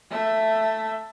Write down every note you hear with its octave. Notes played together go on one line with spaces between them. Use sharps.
A3 E5